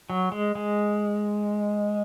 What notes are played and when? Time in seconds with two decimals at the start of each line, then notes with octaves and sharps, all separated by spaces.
0.10 F#3
0.32 G#3
0.55 G#3